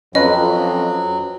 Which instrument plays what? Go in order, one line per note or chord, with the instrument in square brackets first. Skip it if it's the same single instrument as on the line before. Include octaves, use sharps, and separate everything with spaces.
[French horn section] F2 [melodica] F#3 [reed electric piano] C#4 B4 [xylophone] D#5